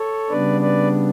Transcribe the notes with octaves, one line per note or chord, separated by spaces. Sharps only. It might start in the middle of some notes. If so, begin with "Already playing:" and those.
Already playing: A4 C#5
C#3 G3 B3 D4 B4 D5
B4 D5